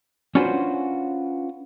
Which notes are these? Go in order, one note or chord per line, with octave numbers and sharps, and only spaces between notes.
C#4 D4 F4 F#4 B4 C5